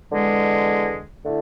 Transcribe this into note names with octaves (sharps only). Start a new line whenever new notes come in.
E2 D3 G#3
D3 A3 E4